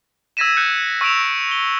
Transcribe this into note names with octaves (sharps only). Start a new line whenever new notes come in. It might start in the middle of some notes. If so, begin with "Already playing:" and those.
E6 G#6 A#6 B6 D#7 E7
F#6 G6 C#7
C#6 E6 A#6 D7 E7 F7
G7